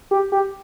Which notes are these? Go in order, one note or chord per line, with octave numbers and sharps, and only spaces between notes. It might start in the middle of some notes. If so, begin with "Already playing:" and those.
G4
G4